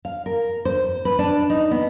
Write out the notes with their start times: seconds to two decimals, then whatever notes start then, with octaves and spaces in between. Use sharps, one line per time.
0.05 F5
0.26 A#4
0.65 C5
1.05 B4
1.19 D4
1.50 D#4
1.71 B3